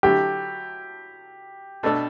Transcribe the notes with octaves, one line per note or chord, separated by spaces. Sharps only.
D3 F#3 A3 E4 G4
B2 A3 D4 A4